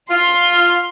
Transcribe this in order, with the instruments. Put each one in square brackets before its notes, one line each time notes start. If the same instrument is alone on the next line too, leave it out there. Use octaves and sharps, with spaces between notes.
[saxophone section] F4 [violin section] C6